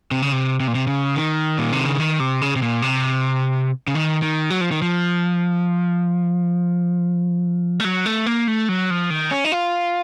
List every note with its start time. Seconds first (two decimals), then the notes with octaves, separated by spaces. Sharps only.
0.11 C3
0.22 C#3
0.32 C3
0.60 C3
0.68 A#2
0.75 C3
0.87 C#3
1.16 D#3
1.58 A#2
1.72 C3
1.86 C#3
2.00 D#3
2.20 C3
2.42 C#3
2.56 C3
2.62 A#2
2.82 C3
3.88 C#3
3.95 D#3
4.22 D#3
4.50 F#3
4.61 F3
4.71 D#3
4.82 F3
7.80 A3
7.85 F#3
8.06 A3
8.26 A#3
8.48 A3
8.69 F#3
8.90 F3
9.10 D#3
9.31 C#4
9.45 D#4
9.52 F4